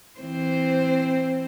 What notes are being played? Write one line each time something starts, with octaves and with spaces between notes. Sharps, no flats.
E3 C4 C5